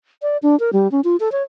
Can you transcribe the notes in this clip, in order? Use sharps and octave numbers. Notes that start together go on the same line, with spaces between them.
D5
D4
A#4
G3
C#4
F4
A4
C#5